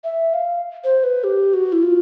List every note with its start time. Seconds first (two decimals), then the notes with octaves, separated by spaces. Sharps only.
0.04 E5
0.34 F5
0.84 C5
1.04 B4
1.24 G4
1.53 F#4
1.73 E4
1.83 F4